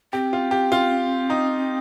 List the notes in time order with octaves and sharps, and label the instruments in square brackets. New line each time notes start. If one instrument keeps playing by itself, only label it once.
[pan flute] C4 [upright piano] G4
[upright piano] F4
G4
F4
D#4